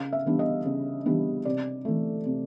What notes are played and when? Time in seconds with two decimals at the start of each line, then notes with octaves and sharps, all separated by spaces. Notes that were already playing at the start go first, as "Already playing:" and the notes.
Already playing: C#3 F5
0.13 E5
0.26 E3 G3 B3 D4
0.39 D#5
0.65 C#3
1.06 E3 G3 B3 D4
1.45 C3 D5
1.85 E3 A3
2.25 C3